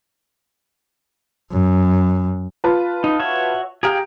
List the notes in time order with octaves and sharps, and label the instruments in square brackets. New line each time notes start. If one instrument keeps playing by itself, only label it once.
[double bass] F#2
[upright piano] F4 B4 A5
[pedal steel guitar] D#4
F#4 C#5 E5
[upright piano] G4 A#5 D7 [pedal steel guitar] G#4 F5 G5